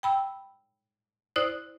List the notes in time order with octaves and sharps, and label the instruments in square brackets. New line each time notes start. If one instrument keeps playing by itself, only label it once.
[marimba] G5 B5 E6
E4 C5 D5 D#6 F#6